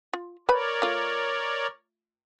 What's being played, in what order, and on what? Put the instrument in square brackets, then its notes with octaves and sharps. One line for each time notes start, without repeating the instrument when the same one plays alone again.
[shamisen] F4
[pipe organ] A#4 C#5 D5 [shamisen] B4 B5
[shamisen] A3 F4